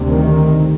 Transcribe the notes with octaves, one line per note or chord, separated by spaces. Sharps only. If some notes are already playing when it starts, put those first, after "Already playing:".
Already playing: D2 C3
D#3